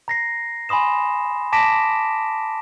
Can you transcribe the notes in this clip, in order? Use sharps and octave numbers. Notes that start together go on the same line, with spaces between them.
A#5 A#6 C7
G#5 B5 C6 D#6 E7
A5 D6 A#6 B6 D7 E7